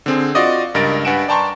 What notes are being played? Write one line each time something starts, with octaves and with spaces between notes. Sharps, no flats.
D3 C4 G#4
F4 F#4 D5 D#5 D#6
C#2 G2 A#4 D#5 A6 D7
G2 B4 F#5 G#5 D7 E7
D5 G5 A5 A#5 C6 C#6